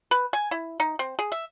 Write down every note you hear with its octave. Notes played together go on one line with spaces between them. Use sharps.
B4
G#5
E4
D#4
C4
G#4
E5